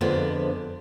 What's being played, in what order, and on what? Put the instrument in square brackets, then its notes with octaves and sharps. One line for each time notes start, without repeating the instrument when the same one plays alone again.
[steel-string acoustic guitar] F2 D3 F3 G#3 B3 D4